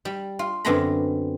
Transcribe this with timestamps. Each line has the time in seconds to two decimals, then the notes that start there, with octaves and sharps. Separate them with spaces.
0.05 G3
0.39 F4
0.65 F#2 D3 B3 C4 A#5 B5